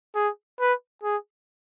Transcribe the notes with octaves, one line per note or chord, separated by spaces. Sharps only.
G#4
B4
G#4